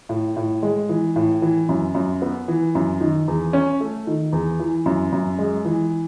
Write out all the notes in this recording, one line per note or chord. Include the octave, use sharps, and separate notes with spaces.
A2
A2
G#3
E3
A2
E3
F#2
F#2
B3
E3
F#2
D#3
E2
C#4
A3
D#3
E2
E3
F#2
F#2
G#3
E3